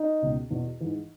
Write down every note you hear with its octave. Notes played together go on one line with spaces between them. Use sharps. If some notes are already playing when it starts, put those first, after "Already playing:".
Already playing: D#4
C#2 B2
E2 B2
G#2 E3